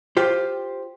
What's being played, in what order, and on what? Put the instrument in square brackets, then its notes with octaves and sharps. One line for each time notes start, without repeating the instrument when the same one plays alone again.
[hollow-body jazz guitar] F4 G4 C5